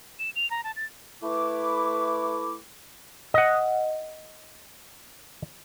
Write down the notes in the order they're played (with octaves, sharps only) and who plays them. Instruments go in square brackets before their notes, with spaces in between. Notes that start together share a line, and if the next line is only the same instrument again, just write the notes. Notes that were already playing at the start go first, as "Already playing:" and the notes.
[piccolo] E7
F7
A#5
A5
A6
[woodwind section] A3 E4 B4 D6
[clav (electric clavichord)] D#5 F#5